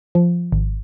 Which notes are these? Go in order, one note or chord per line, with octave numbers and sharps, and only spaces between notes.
F3
G#1